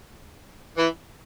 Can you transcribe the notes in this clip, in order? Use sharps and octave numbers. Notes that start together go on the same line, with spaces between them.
E3